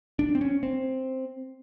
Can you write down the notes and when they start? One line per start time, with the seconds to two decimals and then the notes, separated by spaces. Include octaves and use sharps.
0.19 D4
0.35 C4
0.41 C#4
0.63 C4